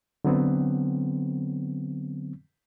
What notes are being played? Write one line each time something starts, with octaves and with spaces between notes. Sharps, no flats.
D3 F#3 B3 C4